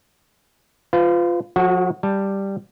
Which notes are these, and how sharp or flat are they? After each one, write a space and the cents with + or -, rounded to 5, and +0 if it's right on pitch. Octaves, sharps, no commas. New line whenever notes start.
F4 +0 B4 +40
F3 +45 F#4 +0 A4 +0
G3 +0 A5 +10